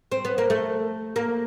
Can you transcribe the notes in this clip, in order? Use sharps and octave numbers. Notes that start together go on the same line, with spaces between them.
C4
B3
A#3
A3
A#3